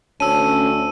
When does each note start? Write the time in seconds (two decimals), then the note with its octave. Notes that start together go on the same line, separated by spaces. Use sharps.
0.20 D2 C#4 A5 E6 D#7